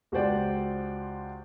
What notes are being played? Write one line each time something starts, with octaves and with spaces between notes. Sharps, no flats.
C#2 F#4 G4 C5 D5 G5